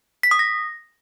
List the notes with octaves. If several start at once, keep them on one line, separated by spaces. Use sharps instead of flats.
B6
D#6
A#6